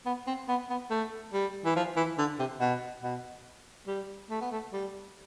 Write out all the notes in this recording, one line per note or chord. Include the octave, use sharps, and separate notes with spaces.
B3
C4
B3
B3
A3
G3
E3
F3
E3
D3
C3
B2
B2
G3
A3
B3
A3
G3